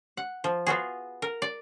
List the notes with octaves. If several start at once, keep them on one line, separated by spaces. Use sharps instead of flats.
F#5
F3
B3 F4 F#4 G#4
A#4
D5